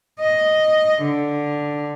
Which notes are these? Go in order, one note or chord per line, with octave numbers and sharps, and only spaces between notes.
D#5
D3